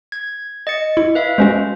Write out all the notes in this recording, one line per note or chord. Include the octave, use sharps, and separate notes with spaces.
G#6
D#5 A6 C#7
E4
B4 E5 F5
G#3 C#4 F#4 C5